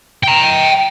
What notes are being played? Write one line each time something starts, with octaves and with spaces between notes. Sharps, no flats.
G5 A#5